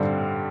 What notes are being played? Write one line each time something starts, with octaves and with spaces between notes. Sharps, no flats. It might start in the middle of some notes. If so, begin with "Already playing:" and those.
Already playing: G2 D3 G3 C4